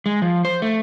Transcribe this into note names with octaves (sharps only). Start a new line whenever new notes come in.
G#3
F3
C5
A3